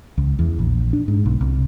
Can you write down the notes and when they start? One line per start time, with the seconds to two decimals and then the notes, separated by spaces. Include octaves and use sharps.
0.18 C#2
0.39 E2
0.59 A#1
0.93 D4
1.08 G#2
1.26 B1
1.41 C2